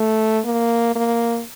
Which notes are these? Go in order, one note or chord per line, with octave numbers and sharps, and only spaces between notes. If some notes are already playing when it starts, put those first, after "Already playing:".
Already playing: A3
A#3
A#3